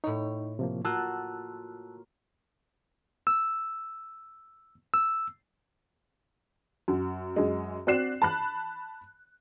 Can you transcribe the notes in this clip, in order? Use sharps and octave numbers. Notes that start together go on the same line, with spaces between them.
A2 D#4 C#5
C3 F3 A#3
A#3 F4 F#4 A5 E6 F#6
E6
E6
F#2
F#2 G#3
C4 F#4 D5 F#6 C7 E7
A5 B5 F#6